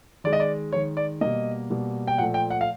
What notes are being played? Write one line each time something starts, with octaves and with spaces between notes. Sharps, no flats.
D#3 G#3 D5
D#5
D5
D#3 G#3 C#5
D5
B2 G3 A#3 D#5
B2 G3 A#3
G5
A#2 F3 A3 F#5
G5
F#5
F5